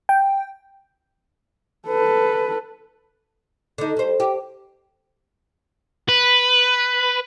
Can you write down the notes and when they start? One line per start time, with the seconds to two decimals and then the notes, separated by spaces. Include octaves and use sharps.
0.09 G5
1.87 A4 B4
3.78 D3 D#4
3.97 G3 C5
4.20 G4
6.09 B4